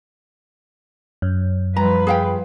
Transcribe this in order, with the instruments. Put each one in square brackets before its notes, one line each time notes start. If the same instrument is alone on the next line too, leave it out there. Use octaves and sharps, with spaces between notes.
[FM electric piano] F#2
[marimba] F3 G3 [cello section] F4 B4 [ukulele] A#5
[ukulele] G#4 F5 G5